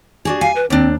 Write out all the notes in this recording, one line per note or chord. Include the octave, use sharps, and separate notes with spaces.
D4 F#4 G#4
F5 G#5
B4
D#2 C4 D4